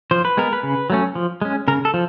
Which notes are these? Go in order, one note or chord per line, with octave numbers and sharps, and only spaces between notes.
F3 C5
B4
G#3 B3 A#4
B4
C#3
F#3 A3 C#4
F3
G#3 C#4
C#3 A#4
A4
F3